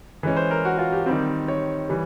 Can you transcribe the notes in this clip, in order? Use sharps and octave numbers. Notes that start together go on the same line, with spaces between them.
E3 G#3 C#4
C5
A#4
F#4
F4
G4
D#3 G3 C4
C#5
E3 G3